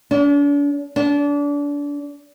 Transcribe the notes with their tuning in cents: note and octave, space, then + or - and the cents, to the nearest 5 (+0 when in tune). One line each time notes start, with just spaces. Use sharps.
D4 -40
D4 -30